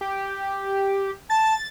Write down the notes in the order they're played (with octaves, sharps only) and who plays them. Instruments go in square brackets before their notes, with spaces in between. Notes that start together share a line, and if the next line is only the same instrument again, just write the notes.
[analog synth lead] G4
[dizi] A5 [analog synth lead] A6